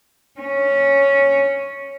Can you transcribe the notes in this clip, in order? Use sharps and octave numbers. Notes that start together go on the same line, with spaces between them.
C#4